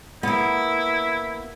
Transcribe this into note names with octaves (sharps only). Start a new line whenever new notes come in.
A#3 B3 E4